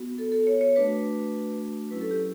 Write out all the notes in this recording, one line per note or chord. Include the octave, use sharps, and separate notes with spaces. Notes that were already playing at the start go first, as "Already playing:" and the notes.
Already playing: B3 F#4
A4
A4
C#5
C#5
A3 D4 F#4 B4
F#3 C#4 E4 B4
A4
G4